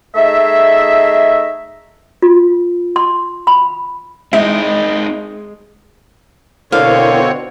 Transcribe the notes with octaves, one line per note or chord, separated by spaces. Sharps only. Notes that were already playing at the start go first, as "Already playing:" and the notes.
A3 D#4 G#4 D#5 E5
F4
C6
B5
G#3 C4 D#4 E4 D#5
B2 D3 C4 E4 A#4 C5 C#5 F5